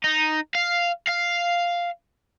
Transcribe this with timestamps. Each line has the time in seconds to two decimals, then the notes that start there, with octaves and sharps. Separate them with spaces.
0.04 D#4
0.55 F5
1.07 F5